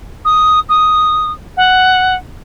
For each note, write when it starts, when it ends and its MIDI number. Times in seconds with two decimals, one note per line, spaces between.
0.25 0.60 87
0.69 1.32 87
1.57 2.15 78